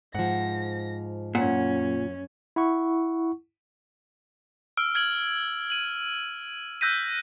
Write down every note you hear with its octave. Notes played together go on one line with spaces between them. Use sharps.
G#2 F3 F#5 A#6
F#2 A#2 C#4 F#5
E4 F#5 C#6
E6 F6 D7
F6 G#6 D7 F#7
D#7 F#7
E6 F#6 G6 A#6 B6 D#7